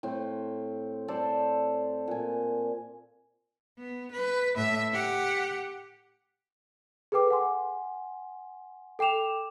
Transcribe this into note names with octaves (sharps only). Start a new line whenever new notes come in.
A2 C4
A4 C5 D5
A#2 G#5
B3
B4
A2 E5
G4 F#5
G#4 A4 B4 G5 D6
F#5 G#5 C6
A4 G5 D6 E7 F7